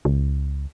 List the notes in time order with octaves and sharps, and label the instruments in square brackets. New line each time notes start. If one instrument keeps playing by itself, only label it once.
[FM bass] C#2